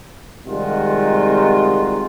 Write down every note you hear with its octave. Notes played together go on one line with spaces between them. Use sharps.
C3 D#3 G3 G#3 F4 F#4